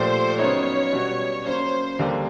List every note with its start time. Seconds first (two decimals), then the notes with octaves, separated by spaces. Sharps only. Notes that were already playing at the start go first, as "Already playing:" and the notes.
Already playing: A#2 F3 A3 D4 G4 C5
0.39 C#3 F#3 B3 D#4 C#5
0.92 B2 G3 B3 D4 F#4
1.46 C#3 F#3 A#3 C#4 C5
1.99 D#2 D3 G3 A#3